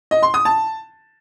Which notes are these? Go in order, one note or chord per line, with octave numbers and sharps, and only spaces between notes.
D#5
C6
D#6
A5